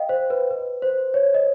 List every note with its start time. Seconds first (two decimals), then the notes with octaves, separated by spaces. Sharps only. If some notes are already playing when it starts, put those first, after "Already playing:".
Already playing: D#5 F5 G5
0.09 C5
0.30 B4
0.51 B4
0.82 C5
1.14 C#5
1.34 D#5